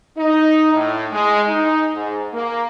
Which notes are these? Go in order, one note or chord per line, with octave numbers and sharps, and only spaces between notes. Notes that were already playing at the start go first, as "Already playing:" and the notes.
D#4
A2
G#3
D#4
G#2
A#3